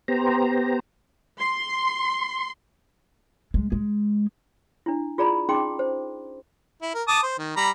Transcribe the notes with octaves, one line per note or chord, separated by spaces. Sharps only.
B3 G4 C5 A#5
C6
G#3
G#3
D4 E4
F4 G#4 D5 A#5 B5
C#4 D#4 G#4 G5 C6 D6
C5
E4
A#4
A5 D6 D#6
C5
D#3
G3 A#5 B5